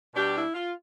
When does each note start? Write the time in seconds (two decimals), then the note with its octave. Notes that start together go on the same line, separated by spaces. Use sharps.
0.15 B2 G3 D4 G4
0.35 E4
0.54 F4